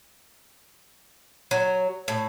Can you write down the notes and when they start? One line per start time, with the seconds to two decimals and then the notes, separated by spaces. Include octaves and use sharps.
1.51 F#3
2.08 A2